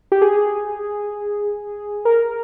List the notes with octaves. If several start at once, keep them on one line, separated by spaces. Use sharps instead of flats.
G4
G#4
A#4